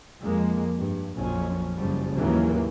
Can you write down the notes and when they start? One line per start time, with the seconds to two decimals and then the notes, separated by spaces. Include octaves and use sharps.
0.20 F2 G#3 A#3
0.74 G2
1.16 A#1 F2 F#3 C#4
1.76 F#1 C#3 F3 G3
2.16 D#2 G#2 C#3 E3 F#3 A#3